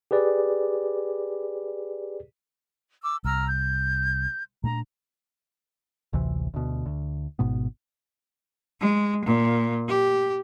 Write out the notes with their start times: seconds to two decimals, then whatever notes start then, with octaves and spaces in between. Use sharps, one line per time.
0.11 G4 G#4 B4 D5
3.02 D6 E6
3.25 C2 A#5 E6 F6
3.47 G6
4.64 A#2 A3 D4 A#5
6.13 A1 D2 C3 E3
6.54 D2 B2
6.86 D2
7.39 G#1 G#2 B2 B3
8.81 G#3
9.25 A#2
9.88 G4